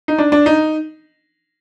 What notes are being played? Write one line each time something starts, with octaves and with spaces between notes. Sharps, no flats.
D#4
D4
D4
D#4